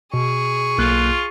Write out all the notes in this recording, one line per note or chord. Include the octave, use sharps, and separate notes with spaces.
B2 G#4 C#6
B1 A#3 F4 F#6